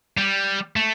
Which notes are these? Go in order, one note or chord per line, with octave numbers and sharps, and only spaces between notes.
G3
A3